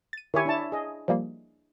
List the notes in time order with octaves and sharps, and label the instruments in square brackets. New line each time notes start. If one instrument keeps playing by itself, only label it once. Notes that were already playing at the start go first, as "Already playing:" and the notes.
[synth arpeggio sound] A6 D#7
[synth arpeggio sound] D#3 G4 [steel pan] E4 C#5 G#5
[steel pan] D4 E4 A5
G#4 D#5
[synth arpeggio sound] F3 G3 A#3